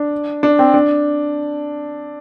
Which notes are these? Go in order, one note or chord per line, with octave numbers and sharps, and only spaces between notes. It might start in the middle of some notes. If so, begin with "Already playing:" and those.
Already playing: D4
D4
C4
D4